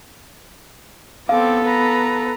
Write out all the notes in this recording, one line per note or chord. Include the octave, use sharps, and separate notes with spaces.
B3 C4 A4 F5 D6
B4 A#5